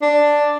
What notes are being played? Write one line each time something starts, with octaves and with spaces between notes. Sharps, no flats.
D4